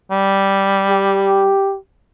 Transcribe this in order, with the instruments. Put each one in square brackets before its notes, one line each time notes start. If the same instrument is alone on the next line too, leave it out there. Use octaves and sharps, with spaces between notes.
[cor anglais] G3
[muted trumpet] G4